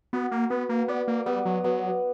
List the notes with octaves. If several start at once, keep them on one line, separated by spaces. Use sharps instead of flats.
B3 F#4
A#3
B3 B4
A#3
B3 D5
A#3
G3 B3
F#3
F#3 B3